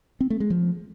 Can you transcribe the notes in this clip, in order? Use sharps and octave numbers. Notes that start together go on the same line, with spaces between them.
C4
A3
G#3
F3